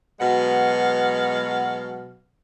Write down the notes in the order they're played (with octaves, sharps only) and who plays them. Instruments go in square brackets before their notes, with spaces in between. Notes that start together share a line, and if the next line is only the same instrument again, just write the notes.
[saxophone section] B2 F#3 G#3 B4 F5 F#5